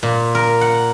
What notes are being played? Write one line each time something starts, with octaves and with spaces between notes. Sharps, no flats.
A#2
A#4
F#5